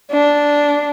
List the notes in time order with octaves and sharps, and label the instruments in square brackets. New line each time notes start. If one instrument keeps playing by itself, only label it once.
[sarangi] D4